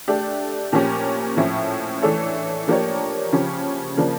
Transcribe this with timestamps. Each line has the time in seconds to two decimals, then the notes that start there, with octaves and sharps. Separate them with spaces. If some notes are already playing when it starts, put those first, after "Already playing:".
0.08 A3 D4 G4
0.72 A#2 F3 C#4 G4
1.37 A2 F3 C#4 E4
2.02 E3 A3 D4 A4 C#5
2.68 F3 A#3 D4 G4 C#5
3.32 C#3 F3 C#4 G4
3.97 C#3 F3 A#3 D4